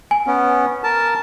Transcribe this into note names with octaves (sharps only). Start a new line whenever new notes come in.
G#5
B3 C#4
A#4 A5